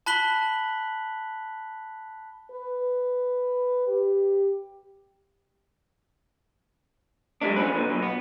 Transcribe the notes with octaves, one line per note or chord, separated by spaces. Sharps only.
A5 B5 F#6 B6 F#7 G7
B4
G4
F#3 G#3 A3 D4
D3 F3 B3 C#4 B4
A#2 D3
B1 B2
B3